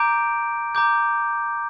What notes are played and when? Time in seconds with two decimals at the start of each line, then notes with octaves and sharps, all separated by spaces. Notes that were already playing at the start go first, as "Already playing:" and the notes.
Already playing: A#5 D6 G6 D7
0.75 A#5 D6 G6